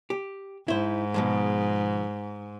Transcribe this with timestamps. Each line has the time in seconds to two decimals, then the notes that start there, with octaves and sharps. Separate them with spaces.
0.10 G4
0.68 G#2 E4 C5
1.14 B2 F3 G#3